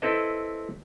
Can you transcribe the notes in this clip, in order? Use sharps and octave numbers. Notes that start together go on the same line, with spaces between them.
C4 E4 A4 B4 D#5